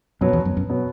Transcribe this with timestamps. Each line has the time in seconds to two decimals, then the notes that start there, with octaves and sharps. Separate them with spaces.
0.21 F#2 B2 F#3 B3
0.33 E2
0.45 F#2
0.57 F#2
0.69 B2 F#3 B3